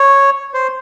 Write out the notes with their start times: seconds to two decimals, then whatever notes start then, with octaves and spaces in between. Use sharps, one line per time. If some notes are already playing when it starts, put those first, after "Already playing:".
Already playing: C#5
0.54 C5